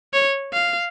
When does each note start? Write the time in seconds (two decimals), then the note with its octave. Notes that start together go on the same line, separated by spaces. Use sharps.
0.13 C#5
0.53 F5